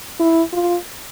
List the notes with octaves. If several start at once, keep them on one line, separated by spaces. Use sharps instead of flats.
E4
F4